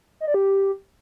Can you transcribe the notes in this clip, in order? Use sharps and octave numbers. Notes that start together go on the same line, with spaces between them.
D#5
D5
G4